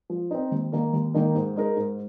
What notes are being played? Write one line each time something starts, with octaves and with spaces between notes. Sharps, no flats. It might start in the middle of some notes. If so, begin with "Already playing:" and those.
F3
C4 D#4
D#2
D#3 A#3 D#4 A#4
D#2
D#3 A#3 D#4 A#4
G#2
G#3 D#4 A#4
G#2